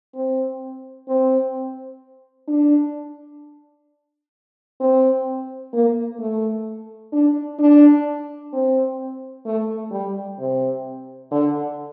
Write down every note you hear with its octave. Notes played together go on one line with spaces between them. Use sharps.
C4
C4
D4
C4
A#3
A3
D4
D4
C4
A3
G3
C3
D3